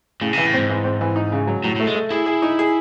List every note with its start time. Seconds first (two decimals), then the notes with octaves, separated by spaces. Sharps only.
0.21 A2 C#3
0.33 C3 E3
0.46 A2
0.54 G#2 C4
0.70 E3
0.84 C4
1.01 E3
1.16 D#4
1.32 C#3
1.47 F#3
1.64 A2 F#3
1.76 A2 A3
1.87 G#3
1.95 A3
2.10 E4 G#4
2.26 G#4
2.42 D#4
2.59 G#4